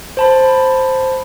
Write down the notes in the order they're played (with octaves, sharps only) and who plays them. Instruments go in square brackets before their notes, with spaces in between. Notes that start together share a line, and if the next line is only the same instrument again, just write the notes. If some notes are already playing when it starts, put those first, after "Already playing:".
[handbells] C5 A5 B5